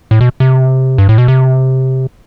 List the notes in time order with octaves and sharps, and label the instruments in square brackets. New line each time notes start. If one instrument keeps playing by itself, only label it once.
[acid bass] A2
B2
C3
G2
A2
B2
C3